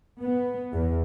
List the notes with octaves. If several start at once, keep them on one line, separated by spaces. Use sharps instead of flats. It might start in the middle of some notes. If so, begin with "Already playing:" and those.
B3
E2